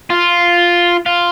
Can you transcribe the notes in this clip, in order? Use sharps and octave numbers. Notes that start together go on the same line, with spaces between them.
F4
F4